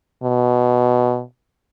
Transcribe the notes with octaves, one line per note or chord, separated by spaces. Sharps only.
B2